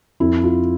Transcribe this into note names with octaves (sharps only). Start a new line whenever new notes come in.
F2 E4
F4